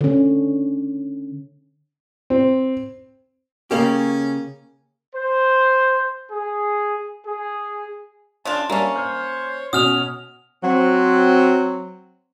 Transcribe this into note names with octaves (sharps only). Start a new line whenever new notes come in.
D3 C#4
C4
C#3 A#3 C#4 G4
C5
G#4
G#4
C#3 D4 F4 A5
G3 A#3 C#4 D4 E5 A5
C5 C#5 F6
B2 C#4 F#4 D#6 F6 F7
F#3 C4